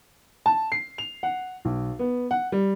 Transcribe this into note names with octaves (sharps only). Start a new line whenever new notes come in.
A5
C7
F7
F#5
B1
B3
F#5
G3